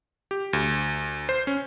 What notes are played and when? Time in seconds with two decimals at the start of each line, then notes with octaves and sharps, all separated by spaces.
0.31 G4
0.53 D2
1.29 C5
1.47 C#4